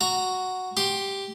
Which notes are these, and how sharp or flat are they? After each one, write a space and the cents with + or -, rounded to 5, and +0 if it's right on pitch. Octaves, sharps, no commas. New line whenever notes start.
F#4 +0 A#5 +0
G4 +0 C6 +15